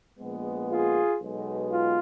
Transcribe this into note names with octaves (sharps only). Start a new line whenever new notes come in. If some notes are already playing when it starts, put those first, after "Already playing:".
A#1 A#2 G#3 B3
F4 G#4
B1 B2 G#3 B3
F4